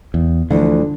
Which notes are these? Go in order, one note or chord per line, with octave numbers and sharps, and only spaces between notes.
E2
D2 D3 E3 F3